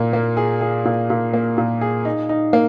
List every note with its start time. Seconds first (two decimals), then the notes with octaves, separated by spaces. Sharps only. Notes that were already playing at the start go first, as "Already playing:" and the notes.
Already playing: A#2 A#3
0.13 A#3
0.37 G#4
0.61 G#4
0.85 A#2
1.10 A#2
1.34 A#3
1.58 A#2
1.81 G#4
2.05 D#4
2.29 D#4
2.53 A#3